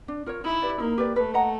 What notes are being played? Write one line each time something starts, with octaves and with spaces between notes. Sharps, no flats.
D4
F4 A#4 C#5
D#4 E4
G4 B4 D5
A#3 D#4
G4 B4 D5
A3 B4
D#5 F#5 A#5